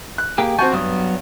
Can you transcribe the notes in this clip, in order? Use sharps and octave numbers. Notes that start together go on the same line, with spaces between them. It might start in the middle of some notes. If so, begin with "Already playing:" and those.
F#6
A#3 G4 G#4
C4 F#4 G#5 A5 C#6 G6
G2 F#3 B3 D#6